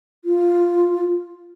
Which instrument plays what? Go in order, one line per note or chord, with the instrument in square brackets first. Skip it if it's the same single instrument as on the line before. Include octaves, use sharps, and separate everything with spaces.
[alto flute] F4